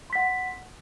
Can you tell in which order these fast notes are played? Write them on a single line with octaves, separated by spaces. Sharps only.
C6 B6 F#5